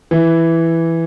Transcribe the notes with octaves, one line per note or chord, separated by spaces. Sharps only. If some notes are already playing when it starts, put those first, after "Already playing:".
E3